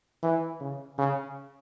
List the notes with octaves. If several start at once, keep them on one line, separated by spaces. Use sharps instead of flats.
E3
C#3
C#3